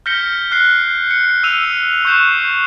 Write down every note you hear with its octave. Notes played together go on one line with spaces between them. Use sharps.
F6 G6 A#6 B6 C#7 G7
F6 F#6 C7
C#7
E6 D#7 F7
C#6 F#6 G6 C7 E7